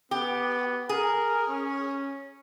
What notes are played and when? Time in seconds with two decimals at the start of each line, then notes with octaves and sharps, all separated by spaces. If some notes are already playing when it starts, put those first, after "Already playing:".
0.11 B3 G4
0.89 G#4 A#4
1.49 C#4